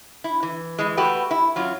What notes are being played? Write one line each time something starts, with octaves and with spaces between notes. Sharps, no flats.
E4
E3
E3 G#3
A3 F#4 G4 B4
E4
F#2 F#3 F4